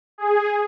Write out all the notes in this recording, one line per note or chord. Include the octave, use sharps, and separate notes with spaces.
G#4